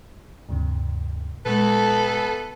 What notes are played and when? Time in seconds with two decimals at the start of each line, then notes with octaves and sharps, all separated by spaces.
0.49 D2 G2 C3
1.46 A#2 G#3 A3 B3 A4 B4